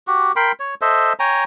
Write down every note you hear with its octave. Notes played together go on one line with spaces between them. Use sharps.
F#4 G4
A#4 G5 B5 C6
C#5
A4 C5 D#5 E5
C#5 G5 G#5 A#5